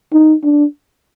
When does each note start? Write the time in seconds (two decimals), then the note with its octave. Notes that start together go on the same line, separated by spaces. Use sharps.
0.13 D#4
0.44 D4